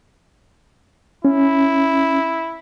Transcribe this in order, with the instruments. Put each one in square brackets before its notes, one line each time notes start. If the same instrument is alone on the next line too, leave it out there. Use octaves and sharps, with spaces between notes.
[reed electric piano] C#4 [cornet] E4